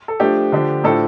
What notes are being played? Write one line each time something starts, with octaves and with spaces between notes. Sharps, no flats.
A4
F3 A3 D4 G4
D3 F3 D4
A2 F3 D4 A4